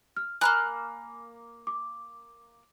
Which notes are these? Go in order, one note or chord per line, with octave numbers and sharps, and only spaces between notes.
F6
A#3 G#5 A#5 B5 F6 F#6
D6